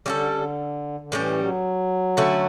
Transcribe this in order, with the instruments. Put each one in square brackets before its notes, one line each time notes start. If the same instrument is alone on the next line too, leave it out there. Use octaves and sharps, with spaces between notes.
[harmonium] D3 [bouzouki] G3 C#4 F#4 A4
[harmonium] D3
D3
[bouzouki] A2 G3 C#4 G4 [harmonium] E3
[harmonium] F#3
[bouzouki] D3 A3 C#4 F#4